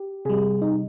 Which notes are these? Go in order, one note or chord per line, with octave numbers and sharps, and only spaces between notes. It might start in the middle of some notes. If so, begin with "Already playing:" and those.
Already playing: G4
C3 G3 G#4
D#4